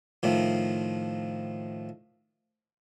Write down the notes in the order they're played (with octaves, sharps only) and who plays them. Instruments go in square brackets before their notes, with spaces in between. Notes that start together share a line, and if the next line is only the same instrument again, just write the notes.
[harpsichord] A2 D#3 F3